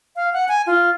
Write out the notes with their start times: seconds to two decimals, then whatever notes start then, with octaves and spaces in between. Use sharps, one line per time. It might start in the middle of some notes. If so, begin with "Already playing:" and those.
0.16 F5
0.33 F#5
0.49 G#5
0.67 F4